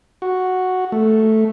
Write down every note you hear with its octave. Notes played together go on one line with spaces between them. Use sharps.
F#4
A3